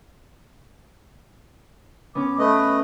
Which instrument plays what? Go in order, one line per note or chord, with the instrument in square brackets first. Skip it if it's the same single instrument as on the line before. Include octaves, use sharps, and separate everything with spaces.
[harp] B3 C#4 [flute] D6
[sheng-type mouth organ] A3 D#5 [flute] B4